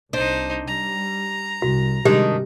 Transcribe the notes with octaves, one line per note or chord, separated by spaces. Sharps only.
C2 D4 D#4 C5
G3 A#5
C2 F#4
G2 C3 D#3 G#3 D4 G4